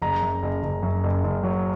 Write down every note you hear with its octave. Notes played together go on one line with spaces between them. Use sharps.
F#1 A#5
F#2
F#1
F#1
F#2
F#1
F#1
F#3